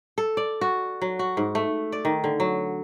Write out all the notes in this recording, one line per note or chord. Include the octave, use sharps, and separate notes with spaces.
A4
D5
F#4
F#3
F#4
G#2
A3
D5
D#3
D3
F#3